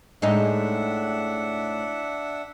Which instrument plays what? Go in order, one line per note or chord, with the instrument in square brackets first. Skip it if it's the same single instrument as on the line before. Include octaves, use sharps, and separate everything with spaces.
[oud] A2 G#3 D#4 [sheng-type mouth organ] D4 E5 F#5